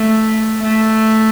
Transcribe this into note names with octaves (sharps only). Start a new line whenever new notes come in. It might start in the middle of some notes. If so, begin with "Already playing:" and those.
Already playing: A3
A3